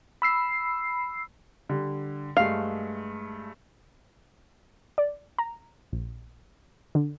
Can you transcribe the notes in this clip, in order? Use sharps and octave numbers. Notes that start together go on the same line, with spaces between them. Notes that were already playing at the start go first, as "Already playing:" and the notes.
B5 E6 C7
D3 G3
G2 G#3 A3 F5
D5
A#5
A#1
D3